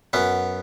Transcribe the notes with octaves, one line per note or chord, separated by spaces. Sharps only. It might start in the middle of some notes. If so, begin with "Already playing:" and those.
F#2 F#3 B3